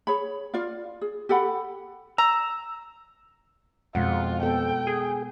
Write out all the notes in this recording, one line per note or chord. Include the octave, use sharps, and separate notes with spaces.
G#4 C#5 B5
F4 D5 F5
G#4
G4 A4 F#5 B5
A#5 E6
F2 B2 G#3 F4 F#5
B3 A4 G5
G#4